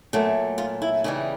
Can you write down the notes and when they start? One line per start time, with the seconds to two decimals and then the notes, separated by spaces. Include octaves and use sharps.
0.13 A#2 F#3 A3
0.58 F4
0.82 E4
1.04 C#3 E3 G3 D#4